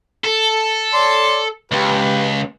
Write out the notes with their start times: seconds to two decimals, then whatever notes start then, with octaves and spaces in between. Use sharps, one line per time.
0.24 A4
0.94 C#5 D5 C6
1.72 C#2 G4 B4